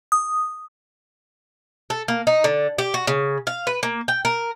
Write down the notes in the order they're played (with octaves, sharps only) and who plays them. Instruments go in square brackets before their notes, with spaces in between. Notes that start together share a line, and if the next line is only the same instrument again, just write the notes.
[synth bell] D#6
[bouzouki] A4
A#3
D#4
D3
G4
F#4
C#3
F5
B4
A#3
G5
A#4